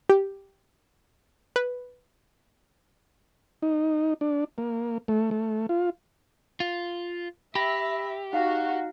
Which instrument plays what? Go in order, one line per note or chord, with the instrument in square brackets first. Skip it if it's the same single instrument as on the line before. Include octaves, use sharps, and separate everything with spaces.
[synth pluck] G4
B4
[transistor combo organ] D#4
D4
A#3
A3
A3
F4
[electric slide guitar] F4
[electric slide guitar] G4 [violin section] E5 [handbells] B5 A#6
[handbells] D#4 F5 [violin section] F#4